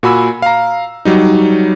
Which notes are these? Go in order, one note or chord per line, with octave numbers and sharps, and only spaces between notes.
A#2 F#4 G#5 B5 E6
F5 A#5
F#3 G3 D#4